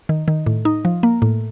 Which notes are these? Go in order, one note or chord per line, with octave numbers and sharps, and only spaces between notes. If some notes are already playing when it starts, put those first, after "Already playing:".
D#3
D#3
A2
D#4
F3
A#3
A2